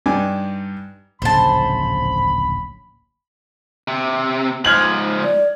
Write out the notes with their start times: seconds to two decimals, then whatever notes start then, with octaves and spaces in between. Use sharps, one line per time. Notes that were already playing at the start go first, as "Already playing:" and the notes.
0.06 G2 D4 D#4 G4 G#5 D6
1.22 D1 A#1 C#3 C5 A5 B5
3.88 C3
4.65 G#2 F3 F6 G#6 F#7
5.23 D5